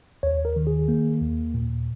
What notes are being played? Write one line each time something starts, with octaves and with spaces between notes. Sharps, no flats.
D#2 C#5
A#4
D#3
G#4
A#3
D#2
A#2